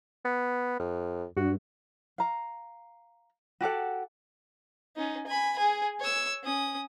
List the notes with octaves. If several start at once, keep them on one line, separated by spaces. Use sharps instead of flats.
B3
F2
G2 F#4
F5 A#5
F#4 G4 A4 F#5
C#4 D#4
G#5 B5
G#4 G#5
C#5 E6
C#4 D#6